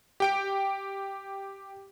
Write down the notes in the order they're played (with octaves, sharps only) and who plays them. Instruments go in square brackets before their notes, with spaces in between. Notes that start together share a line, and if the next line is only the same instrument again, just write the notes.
[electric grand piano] G4 G5 D7